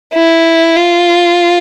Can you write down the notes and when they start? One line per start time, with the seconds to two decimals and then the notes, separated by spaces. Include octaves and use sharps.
0.14 E4
0.77 F4